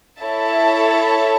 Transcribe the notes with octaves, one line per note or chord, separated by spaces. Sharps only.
E4 A4 C#5 E5 A5